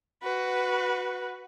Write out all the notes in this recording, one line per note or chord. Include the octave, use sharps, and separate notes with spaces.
F#4 B4